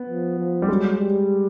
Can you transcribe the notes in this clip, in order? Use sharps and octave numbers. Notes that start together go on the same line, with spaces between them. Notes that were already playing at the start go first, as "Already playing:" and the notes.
Already playing: B3
F3
F3
G3
F#3 G#3
G3